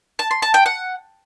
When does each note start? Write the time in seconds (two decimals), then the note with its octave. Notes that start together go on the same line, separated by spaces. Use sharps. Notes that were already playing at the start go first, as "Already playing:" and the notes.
0.19 A5
0.31 C6
0.42 A5
0.54 G5
0.66 F#5